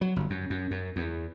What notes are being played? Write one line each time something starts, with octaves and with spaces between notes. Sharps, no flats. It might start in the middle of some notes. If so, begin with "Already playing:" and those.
F#3
G1
F#2
F#2
F#2
E2